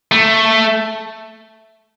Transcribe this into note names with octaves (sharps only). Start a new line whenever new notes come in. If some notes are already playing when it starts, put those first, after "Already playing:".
A3